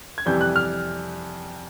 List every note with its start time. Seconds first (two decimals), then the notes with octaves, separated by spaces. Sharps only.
0.18 G#6
0.26 F2 C3 E3 G3 G6
0.41 F#6
0.56 F6